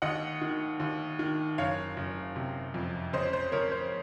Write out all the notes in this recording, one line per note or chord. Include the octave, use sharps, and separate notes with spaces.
D#2 D#5 F#5
D#3
D#2
D#3
F#1 C#5 F5
F#1
C3
F2
C#3 C5 D#5
C5
C#3 A#4 C#5
C5